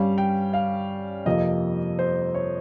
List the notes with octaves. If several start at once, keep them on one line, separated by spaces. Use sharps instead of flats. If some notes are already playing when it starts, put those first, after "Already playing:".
Already playing: G2 G3 C#4 F5
G5
F5
F2 C3 F3 A#3 D#5
C5
C#5